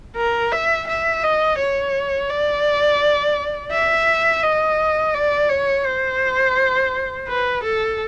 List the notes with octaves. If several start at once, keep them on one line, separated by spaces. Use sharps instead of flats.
A#4
E5
E5
D#5
C#5
D5
E5
D#5
D5
C#5
C5
B4
A4